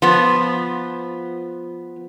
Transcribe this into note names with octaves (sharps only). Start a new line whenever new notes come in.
F3 B3